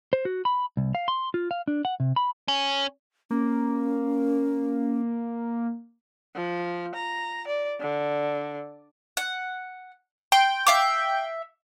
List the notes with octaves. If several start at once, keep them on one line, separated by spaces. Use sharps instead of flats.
C5
F#4
B5
C2
F5
C6
F4
F5
D4
F#5
C3
B5
C#4
A#3 C#4
F3
A#5
D5
D3
F#5
G5 C6
E5 F5 D6